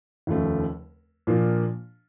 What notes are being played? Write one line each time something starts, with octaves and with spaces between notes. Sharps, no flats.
F1 D#2 C#3 F3 A3
A#2 F3 A#3 D4 F4